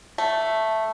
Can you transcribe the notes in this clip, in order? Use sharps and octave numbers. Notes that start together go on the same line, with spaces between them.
A3